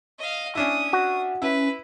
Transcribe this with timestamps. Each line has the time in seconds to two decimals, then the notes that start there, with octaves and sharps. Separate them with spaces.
0.18 D#5 F5
0.55 C#4 D4 E4 D#6
0.93 F#4
1.42 C#4 E4 B4